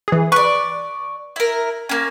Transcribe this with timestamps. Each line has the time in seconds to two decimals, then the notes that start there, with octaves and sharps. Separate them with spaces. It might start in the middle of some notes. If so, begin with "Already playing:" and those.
0.08 E3 G#4
0.32 B4 D5 C#6
1.36 E4 A#4
1.89 A#3 C#4